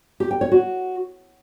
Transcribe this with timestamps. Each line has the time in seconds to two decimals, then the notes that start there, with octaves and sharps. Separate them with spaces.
0.20 G4
0.31 G5
0.41 C#5
0.52 F#4